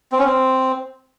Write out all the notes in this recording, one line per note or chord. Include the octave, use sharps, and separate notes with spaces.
C4
C#4
C4